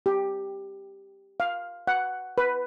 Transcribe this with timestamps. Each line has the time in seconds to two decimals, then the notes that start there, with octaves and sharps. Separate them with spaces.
0.06 G4
1.40 F5
1.87 F#5
2.38 B4